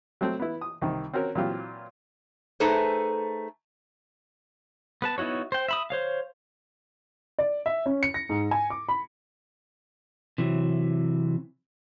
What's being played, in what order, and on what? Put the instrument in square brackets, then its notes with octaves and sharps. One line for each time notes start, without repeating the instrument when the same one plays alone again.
[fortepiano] F#3 A3 C4
B3 E4
D#6
C2 D#3
C4 C#4 F#4 A#4 C#5
A#2 E3 F#3 C4 F4 G4
[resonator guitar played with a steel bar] A3 D#4 G#4 A4 B4 C5
[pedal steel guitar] B3 B4 A5
B3 D#4 E4 F#4 C#5
C5 G5
E5 B5 D#6
C5 C#5 F5
[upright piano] D5
E5
C#4
C#7
A#6
G#2
G#5
D6
B5
[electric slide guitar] C3 E3 F#3